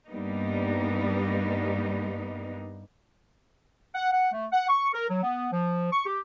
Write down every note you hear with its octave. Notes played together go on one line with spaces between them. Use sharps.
G2 G3 A#3 B3 D#4
F#5
F#5
A3
F#5
C#6
A#4
F#3
B3
F3
C#6
G4